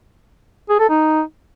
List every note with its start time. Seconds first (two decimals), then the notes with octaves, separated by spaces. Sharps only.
0.70 G#4
0.79 A4
0.89 D#4